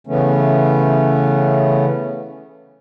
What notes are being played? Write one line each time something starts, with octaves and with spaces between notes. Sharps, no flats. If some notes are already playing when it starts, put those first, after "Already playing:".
C#3 E3 A3 B3 C#4